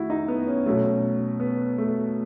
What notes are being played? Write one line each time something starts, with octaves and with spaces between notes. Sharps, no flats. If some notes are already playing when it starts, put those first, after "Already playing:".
Already playing: D#3 A3 E4 F#4
D#4
B3
C#4
B2 F#3 A3
B3
A3